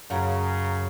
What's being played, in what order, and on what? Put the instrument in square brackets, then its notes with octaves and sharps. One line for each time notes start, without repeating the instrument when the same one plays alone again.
[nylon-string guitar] F#2 [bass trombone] C#3 [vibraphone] F5 A#5